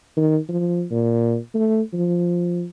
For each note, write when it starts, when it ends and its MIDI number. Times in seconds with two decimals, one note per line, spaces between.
0.17 0.38 51
0.49 0.85 53
0.91 1.37 46
1.54 1.81 57
1.93 2.66 53